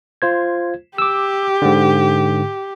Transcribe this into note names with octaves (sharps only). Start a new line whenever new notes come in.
F4 C5 G#6
G4 D6 E6
G#2 D3